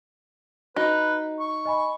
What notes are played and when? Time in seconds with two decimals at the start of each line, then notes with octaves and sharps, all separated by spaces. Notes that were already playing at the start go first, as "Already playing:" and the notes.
0.76 D#4 F#4 B4
1.39 C#6
1.65 D#5 G#5 B5